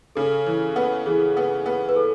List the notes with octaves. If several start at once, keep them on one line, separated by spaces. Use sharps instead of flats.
C#3 A4
E3
B3
E3 G#4
B3
B3
B4
A4